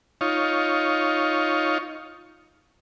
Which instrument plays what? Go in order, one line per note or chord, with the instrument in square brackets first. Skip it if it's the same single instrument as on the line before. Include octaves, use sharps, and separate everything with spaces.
[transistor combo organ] D#4 F4 C#5